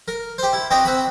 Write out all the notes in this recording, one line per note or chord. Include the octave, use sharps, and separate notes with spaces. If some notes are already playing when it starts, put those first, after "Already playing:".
A#4
G4 C5
E4
C4 F#4 G4 D#5
C4 F#4 B5